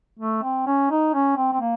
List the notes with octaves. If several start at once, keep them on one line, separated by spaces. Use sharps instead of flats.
A3
C4
C#4
D#4
C#4
C4
C4
A#3